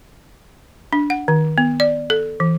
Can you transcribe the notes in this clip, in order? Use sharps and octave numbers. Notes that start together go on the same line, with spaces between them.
D4
F#5
D#3
B3
D5
A4
E3